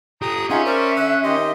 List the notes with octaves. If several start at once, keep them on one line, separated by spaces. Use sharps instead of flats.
G4 A4 A#5 D#6
C#4 D#4 F4 G#4 E5 F#5 G#5
A#4 C5 D5 D6
D3 E6 F#6
D#3 G4 D#5 C6